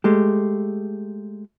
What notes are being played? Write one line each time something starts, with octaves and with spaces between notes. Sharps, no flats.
G#3 A3 G4